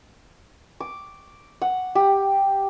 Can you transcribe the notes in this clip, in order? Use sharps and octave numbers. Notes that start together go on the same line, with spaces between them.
D6
F#5
G4